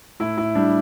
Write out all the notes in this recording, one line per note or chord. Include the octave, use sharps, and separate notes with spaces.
A2 E4
A2 E4
G3 D4